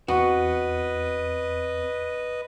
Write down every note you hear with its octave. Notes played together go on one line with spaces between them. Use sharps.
E2 C4 F#4 B4 D#5 C#7